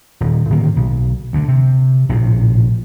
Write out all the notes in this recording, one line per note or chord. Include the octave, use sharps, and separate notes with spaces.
D#1
A2 D3 D#3 A#3
B1
D2 D3
C3
A#1 A2 C3